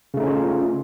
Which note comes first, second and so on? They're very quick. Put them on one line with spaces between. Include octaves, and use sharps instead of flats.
C#3 A3 D#4 C#4 F4